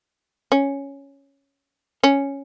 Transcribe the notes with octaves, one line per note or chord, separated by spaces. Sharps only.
C#4
C#4